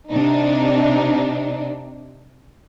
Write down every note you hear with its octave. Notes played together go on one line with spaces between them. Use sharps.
C3 D4 D#4